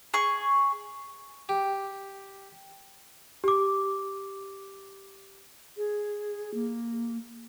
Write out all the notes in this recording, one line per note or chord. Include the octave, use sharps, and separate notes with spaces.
G#4 C#6
G4
G4 D6
G#4
A#3